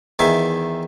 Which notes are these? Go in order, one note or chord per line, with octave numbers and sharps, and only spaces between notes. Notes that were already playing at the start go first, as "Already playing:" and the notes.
E2 D#3 E5 F5 G#5